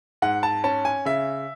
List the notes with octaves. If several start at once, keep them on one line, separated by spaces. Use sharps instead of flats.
G#2 F#5
A5
C#4 A5
G#5
C#3 E5